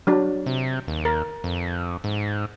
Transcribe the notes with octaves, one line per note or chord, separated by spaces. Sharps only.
F#3 D4
C3
D#2
A#4
F2
G#2